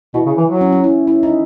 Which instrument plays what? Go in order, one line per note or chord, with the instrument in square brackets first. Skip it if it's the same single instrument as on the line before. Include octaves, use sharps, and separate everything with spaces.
[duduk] B2 [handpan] E4
[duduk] C#3
E3
F#3
[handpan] C#4
C#4
E4
E4
D#4